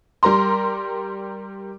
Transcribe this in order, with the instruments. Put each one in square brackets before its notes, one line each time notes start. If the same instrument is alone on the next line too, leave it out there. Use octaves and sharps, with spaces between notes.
[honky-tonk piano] G3 A#4 A#5 C6